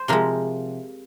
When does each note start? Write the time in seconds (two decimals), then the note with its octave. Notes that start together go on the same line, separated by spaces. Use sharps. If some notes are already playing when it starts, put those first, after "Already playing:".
Already playing: C5
0.08 C3 F3 G#3 A#4